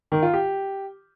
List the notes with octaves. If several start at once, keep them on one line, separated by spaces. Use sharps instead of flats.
D#3
F4
G4